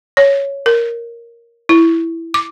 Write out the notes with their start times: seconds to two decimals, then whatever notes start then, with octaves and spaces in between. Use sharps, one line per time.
0.17 C#5
0.66 A#4
1.69 E4
2.34 D6